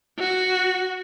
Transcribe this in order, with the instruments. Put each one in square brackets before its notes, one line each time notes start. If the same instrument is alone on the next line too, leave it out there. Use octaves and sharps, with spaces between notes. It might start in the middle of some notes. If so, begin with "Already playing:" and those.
[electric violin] F#4